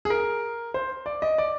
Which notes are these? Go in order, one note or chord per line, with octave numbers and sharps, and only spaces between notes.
G#4
A#4
C5
D5
D#5
D5